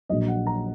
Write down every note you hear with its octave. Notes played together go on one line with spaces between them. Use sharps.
A#1 A#2 F#3 D#5
F#5
A#5